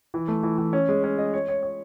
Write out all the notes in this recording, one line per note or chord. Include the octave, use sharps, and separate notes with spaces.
E3
A3
E3
E3
C#4
G#3
C#4
D#5
C#5
C#5
C#5